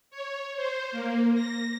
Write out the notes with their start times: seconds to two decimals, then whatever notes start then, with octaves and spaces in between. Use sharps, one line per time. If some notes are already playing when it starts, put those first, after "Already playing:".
0.11 C#5
0.56 C5
0.92 A#3
1.35 A#6